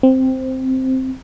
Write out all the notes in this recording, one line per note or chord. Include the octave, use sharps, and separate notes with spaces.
C4